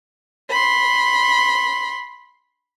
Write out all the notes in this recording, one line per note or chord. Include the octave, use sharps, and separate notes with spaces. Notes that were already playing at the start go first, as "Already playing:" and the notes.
B5 C6